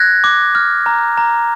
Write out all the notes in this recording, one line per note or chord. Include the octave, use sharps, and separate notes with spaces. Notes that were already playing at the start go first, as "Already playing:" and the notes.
Already playing: F#6 G#6 A#6
D6
F6
A#5
A#5